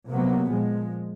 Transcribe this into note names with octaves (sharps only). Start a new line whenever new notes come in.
C3 F#3 A#3 B3
A#2 F3 G#3